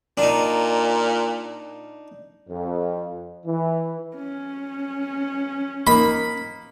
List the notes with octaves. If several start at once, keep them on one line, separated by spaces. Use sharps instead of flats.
A#2 D4 D#4
F2
E3
C#4
A#3 D#4 B5